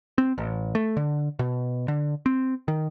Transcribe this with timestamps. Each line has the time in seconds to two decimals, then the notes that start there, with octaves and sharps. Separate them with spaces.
0.18 C4
0.38 A1
0.75 A3
0.97 D3
1.39 B2
1.88 D3
2.26 C4
2.68 D#3